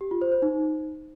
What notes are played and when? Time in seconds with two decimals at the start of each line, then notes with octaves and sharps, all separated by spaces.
0.01 G4
0.11 F4
0.22 C5
0.32 C5
0.42 D#4